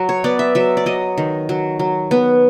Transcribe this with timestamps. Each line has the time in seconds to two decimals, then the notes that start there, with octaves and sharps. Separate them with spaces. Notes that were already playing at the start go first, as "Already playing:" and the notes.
Already playing: F#3
0.09 C#5
0.24 B3 D5
0.39 E5
0.55 F#3 E5
0.77 D5
0.86 F#3 D#5
1.18 D#3
1.49 F#3
1.79 F#3
2.11 B3